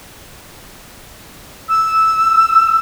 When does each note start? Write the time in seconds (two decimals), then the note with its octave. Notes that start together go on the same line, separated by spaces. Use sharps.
1.69 E6